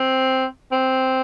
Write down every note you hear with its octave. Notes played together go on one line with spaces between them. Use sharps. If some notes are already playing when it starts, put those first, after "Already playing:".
Already playing: C4
C4